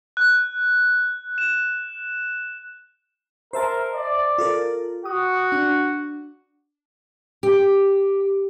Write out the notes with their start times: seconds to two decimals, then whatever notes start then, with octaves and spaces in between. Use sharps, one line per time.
0.17 F#6
1.38 E7
3.53 A#4 C5 E5 A5
3.95 D5
4.38 F4 A4 A#4
5.05 F#4 D#6
5.52 D4
7.43 G4